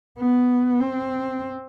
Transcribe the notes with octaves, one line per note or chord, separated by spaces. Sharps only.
B3
C4